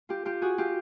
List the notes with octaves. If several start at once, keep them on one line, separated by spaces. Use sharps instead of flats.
F4 G4
F4 G4
F#4 G#4
F4 G4